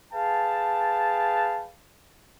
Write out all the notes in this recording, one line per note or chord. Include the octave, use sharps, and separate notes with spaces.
G#4 B4 F5 G5 A5